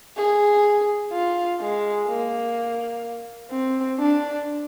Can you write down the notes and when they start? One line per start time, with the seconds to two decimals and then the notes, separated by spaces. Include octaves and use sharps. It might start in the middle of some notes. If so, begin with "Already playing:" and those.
0.17 G#4
1.12 F4
1.61 G#3
2.08 A#3
3.51 C4
4.00 D4